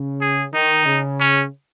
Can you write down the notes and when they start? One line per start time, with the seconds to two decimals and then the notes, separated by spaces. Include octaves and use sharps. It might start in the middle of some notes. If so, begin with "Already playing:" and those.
Already playing: C#3
0.21 G#4
0.53 D#3 D#4
0.86 C#3
1.20 C#4